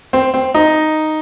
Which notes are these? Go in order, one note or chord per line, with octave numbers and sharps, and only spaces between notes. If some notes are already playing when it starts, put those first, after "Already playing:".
C4
C4
D#4